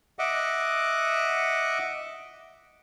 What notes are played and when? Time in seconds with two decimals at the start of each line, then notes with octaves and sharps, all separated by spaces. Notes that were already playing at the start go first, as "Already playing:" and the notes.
0.19 D#5 E5 F#5 D6